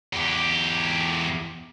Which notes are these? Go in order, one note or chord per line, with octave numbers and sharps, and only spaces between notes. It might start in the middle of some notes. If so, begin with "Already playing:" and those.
E2 G4